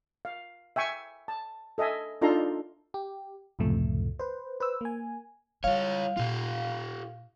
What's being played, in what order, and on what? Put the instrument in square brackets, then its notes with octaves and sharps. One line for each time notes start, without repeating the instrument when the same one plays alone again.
[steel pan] F5
E5 G5 G#5 C#6
A5
A4 D#5 E5 G#5
D4 D#4 F4 A4 A#5 C6
[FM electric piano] G4
C#2 F#2 A2 C3 F3 A3
B4 C5
B4 C5 E6
A#3 G#5
[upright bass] G3 E4 [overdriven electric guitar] F4 C#5 [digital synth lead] F5
[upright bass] A#2 [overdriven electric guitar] F4 G4